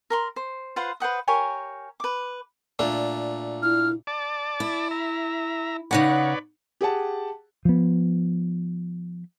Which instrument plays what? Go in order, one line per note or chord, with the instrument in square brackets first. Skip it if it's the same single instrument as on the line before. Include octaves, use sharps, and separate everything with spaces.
[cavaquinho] A#4 A#5 C6
C5
F4 B4 C5 F#5
B4 C5 F#5 D#6
G4 A#4 C#5 G#5
B4 D6
[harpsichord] A#2 A3 D4
[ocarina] E4 [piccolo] F6
[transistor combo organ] D5 A5 D6
[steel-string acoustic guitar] E4
[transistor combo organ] E5 A#5
[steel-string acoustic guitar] C#3 D#4 F#5 [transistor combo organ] B4 C#5 D5
[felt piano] G4 G#4 F#5 A5
[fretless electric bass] F3 B3